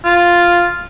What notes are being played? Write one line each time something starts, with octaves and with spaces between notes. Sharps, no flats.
F4